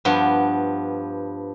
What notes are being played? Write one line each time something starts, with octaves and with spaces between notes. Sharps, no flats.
G2 F3 B3